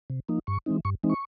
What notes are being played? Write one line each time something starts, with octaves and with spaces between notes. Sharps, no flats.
C3
F3 A#3 D#4
G2 C#6
E3 G#3 C4 D#4
G2 C#6
E3 G#3 C4 D#4
C#6